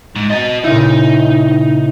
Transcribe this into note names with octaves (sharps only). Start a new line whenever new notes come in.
G#2
F#4 D#5 A#5 A6
A#2 C#3 D#4 E4